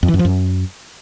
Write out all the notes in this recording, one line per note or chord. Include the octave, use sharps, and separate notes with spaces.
F2
E3
F#2
F3
F#2